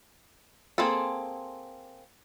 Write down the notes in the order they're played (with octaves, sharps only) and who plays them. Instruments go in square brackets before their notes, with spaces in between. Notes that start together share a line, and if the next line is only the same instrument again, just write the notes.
[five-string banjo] A#3 C4 G#4 A4